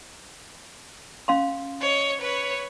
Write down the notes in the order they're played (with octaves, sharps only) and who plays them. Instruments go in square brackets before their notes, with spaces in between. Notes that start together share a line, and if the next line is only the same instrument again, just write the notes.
[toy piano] C#4 F5 C6
[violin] C#5 D#5
B4 C#5